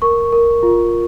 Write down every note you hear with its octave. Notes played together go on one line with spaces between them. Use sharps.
A#4 C#6
A#4
F4